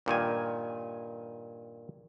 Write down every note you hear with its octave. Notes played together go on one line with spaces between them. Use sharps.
G2 A#2 D#3 G#5